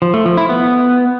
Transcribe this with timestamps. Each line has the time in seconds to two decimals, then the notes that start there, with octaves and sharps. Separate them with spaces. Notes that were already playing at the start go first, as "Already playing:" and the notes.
0.02 F3
0.14 A3
0.26 F3
0.37 E4
0.49 B3